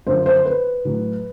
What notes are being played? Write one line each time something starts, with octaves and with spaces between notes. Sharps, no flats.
F#2 D3 F3 C5
C5
B4
A2 F#3